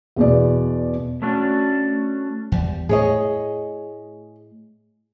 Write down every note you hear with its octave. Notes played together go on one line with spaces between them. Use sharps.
E2 B2 D5
A3 C#4 D4 F#4 A4
E2 G3
A2 G#4 C#5 D#5